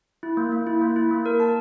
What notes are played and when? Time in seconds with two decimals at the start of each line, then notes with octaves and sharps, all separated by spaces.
0.23 E4
0.37 A#3
0.52 A#3
0.67 E4
0.82 A#3
0.96 E4
1.11 A#3
1.26 A#4
1.40 A5